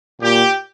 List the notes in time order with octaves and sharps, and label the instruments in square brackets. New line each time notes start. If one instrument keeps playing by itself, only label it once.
[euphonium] A#2 [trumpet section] G4